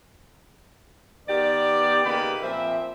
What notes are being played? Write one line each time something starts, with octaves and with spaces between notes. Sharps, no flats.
D#3 B3 G4 D5
C#3 A#3 D#4 G4 B4 B5
A#2 F3 C4 C5 E5